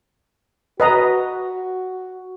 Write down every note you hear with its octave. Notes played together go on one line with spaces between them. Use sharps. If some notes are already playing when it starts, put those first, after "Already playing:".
F#4 B4 D#5 A#5